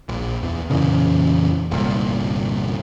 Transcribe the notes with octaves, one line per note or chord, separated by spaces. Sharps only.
A#1
E2
F2 A#2 C#3 E3
G1 C2 A#2